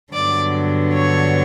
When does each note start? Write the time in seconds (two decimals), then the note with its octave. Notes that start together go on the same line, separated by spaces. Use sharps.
0.12 G2 D3 F#3 B3 D5
0.93 C#5